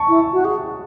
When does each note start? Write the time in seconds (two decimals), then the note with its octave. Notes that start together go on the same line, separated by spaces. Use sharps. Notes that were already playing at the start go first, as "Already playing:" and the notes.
Already playing: A5 C#6
0.08 E4
0.33 F#4
0.44 G#4